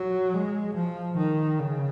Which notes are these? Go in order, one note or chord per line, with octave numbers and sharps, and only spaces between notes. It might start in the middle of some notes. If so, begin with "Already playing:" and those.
Already playing: F#3
G#3
F3
D#3
C#3